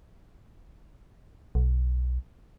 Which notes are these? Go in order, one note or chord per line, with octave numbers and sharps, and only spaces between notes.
B1